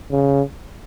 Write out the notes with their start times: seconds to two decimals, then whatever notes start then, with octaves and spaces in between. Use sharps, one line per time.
0.11 C#3